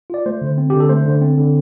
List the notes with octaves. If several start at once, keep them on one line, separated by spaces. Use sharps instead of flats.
F4 D5
A3 C5
D3
C4
D3 G4
A4
A3 C5
D3
C4
D3